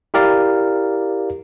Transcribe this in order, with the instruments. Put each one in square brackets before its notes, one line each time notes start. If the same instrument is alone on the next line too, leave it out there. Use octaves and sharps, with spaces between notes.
[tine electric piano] E4 G4 A#4 D5 F5